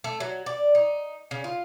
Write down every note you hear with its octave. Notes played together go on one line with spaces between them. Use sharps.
A3
F#3
D5
D#4
C#3
F4